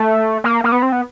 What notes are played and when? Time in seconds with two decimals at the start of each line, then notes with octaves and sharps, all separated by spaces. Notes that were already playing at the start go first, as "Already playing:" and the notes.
Already playing: A3
0.44 A#3
0.64 A#3
0.72 B3
0.82 C4
0.92 B3